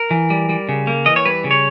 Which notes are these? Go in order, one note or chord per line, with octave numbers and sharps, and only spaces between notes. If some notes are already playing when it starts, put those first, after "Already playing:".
Already playing: A#4
E3
G3
G3
C#3
A#3
E3 D#5
C#5
G3 B4
C#3
C#5